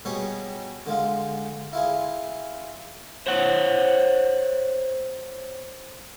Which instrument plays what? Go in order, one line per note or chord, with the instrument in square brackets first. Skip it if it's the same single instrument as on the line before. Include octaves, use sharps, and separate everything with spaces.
[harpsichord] B2 G3 G#4 C#5 D#5
D3 G#3 F4
E4 F4 G#4
[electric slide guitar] C5 C#5 F#5